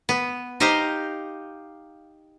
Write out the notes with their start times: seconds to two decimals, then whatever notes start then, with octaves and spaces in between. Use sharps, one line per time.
0.09 B3
0.60 D#4 G4 C5 F5 A#5